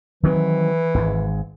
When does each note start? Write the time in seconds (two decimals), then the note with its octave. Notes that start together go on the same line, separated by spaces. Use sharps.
0.23 D#3 E3 F#3 C4
0.94 G#1 G#2